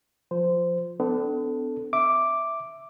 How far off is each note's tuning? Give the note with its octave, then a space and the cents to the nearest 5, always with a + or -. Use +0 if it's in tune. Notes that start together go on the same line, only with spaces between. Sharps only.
F3 +15 C5 -15
B3 +45 D4 +0 A4 +0
E5 +0 D6 +0